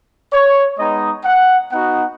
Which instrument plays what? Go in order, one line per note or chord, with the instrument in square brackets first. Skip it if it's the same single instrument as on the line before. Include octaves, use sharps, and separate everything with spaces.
[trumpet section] C#5
G#3 B3 D#4 D#5
F#5
B3 D#4 F#4 F#5